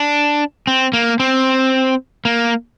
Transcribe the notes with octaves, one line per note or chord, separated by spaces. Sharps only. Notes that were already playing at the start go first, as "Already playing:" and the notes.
Already playing: D4
C4
A#3
C4
A#3